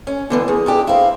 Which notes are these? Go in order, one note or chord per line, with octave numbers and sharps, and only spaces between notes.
C#4
D3 E3 G3 B3
E2 G#4
E2 D4 G4
C4 E4 F5